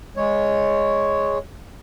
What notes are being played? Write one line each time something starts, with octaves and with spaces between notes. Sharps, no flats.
G#3 C#5